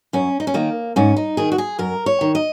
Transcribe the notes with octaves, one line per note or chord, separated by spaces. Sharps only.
F#2 C#4
D#4
C#4
D#3 A#3
G#2 C#4
D#4
D#3 G#4
F#4
G#4
F#2 A#4
C#5
D#3
D#5